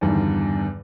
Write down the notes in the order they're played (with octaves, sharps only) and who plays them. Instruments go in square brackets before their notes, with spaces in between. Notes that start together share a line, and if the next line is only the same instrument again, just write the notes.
[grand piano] E2 G2 D3 D#3